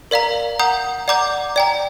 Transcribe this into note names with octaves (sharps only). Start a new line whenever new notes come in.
A#4 D5 F5 A#5
F#5 A#5 D#6 G6
D5 F#5 A#5 D6 G6
D5 G5 A#5